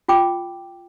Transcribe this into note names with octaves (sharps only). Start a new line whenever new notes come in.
F4 G5 D6